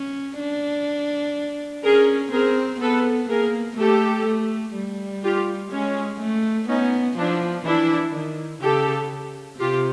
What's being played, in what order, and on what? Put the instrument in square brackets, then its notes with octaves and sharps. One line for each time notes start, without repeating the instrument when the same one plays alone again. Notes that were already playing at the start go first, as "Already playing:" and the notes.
Already playing: [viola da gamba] C#4
D4
[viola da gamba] C#4 [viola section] G#4 A#4
[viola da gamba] C4 [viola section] G#4 A#4
[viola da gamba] B3 [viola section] A4 B4
[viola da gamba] A#3 [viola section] G#4 A#4
[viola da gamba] A3 [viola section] G4 A4
[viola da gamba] A3
G3
[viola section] F4 G4
[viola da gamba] G#3 [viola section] C#4
[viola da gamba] A3
[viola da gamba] B3 [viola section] C#4 D#4
[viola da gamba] F3 [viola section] D4 E4
[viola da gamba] E3 [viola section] D4 E4
[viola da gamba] D#3
[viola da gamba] C#3 [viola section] G4 A4
[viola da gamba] C3 [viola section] F4 G4